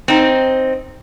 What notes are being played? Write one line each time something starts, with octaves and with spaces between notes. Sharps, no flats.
C4 D#4